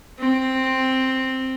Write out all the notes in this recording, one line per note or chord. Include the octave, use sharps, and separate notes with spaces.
C4